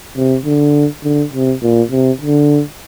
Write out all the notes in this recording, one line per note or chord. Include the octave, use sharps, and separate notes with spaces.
C3
D3
D3
C3
A#2
C3
D3